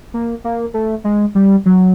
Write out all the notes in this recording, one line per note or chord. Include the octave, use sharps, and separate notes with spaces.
A#3
A#3
A3
G#3
G3
F#3